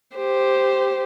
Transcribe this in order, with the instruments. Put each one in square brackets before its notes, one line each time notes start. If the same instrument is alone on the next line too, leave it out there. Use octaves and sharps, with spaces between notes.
[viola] G4 C5